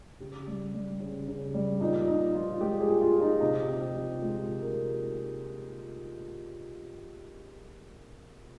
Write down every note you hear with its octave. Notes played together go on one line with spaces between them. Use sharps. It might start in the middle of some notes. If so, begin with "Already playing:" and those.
C#3 G4
G3
G3
C#3
C#3
G3
A#2 D#4
A#2 D#4
F3 F4
G#3 G4
G#4
A#2
F4
A#2
D#4
C3 D#4
C3
G4
F3
G#3 F4
C3
A#4
C3